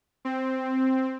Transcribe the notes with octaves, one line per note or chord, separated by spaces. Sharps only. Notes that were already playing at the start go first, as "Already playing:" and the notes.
C4